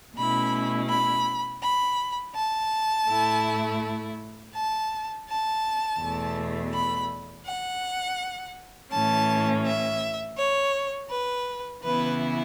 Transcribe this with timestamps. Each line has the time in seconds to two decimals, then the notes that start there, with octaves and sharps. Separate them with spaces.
0.16 B2 A3 C#4 E4 B5
0.89 B5
1.62 B5
2.35 A5
3.08 A2 A3 E4
4.54 A5
5.27 A5
6.00 E2 B2 A3
6.73 B5
7.45 F#5
8.91 A2 E3 C#4 A5
9.64 E5
10.37 C#5
11.10 B4
11.83 C#3 E3 B3 E4 B4